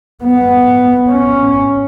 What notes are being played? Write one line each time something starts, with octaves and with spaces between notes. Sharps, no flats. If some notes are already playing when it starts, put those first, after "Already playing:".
B3
C#4